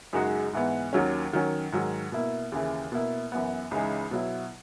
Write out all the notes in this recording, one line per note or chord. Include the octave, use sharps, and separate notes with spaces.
F#2 C#3 G#3 D#4 F#4
G#2 E3 B3
D#2 D#3 F#3 C#4
D#3 F#3 C#4
G#2 D#3 F#3
B2 A#3 E4
D#2 C#3 E3
B2 A#3 E4
F#2 E3 B3
C#2 C#3 E3 G#3 D#4
B2 F#3 B3 E4